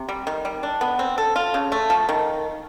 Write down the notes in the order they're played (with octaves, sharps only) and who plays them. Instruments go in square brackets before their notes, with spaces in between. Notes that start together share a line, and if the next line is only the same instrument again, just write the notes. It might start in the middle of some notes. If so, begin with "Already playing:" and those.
Already playing: [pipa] C3
G3
D#3
G3
D4
B3
C4
A4
F4
C#3
A3
F3
D#3